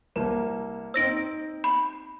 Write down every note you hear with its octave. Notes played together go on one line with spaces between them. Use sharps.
C2 A#3 E7
C4 D#4 C5 E6 A#6 D7
B5